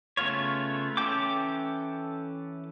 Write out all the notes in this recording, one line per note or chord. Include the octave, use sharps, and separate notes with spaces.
C#3 A3 B3 F4 C#5
E3 C#4 A4 G5 D6